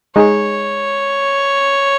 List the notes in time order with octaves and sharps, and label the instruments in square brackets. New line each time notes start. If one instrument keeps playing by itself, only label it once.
[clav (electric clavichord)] G#3 D#4 G#4 [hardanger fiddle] C#5